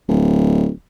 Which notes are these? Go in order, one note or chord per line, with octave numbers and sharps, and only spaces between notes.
D1